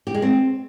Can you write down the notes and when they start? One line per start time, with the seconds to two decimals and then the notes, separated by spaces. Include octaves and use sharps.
0.07 G4
0.14 G#3
0.22 C4